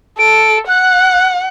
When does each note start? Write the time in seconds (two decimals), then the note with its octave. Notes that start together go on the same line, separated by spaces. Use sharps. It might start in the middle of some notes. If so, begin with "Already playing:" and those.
0.19 A4 D7
0.69 F#5 F#6